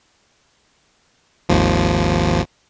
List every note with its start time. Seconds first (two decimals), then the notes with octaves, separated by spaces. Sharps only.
1.49 G#1 D#2 F3